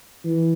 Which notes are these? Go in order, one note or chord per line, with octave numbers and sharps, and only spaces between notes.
E3